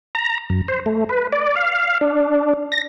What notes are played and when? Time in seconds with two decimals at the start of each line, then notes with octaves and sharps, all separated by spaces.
0.15 A#5
0.50 F#2
0.68 C5
0.86 A3
1.09 B4
1.32 D5
1.56 F5
2.01 D4
2.72 A#6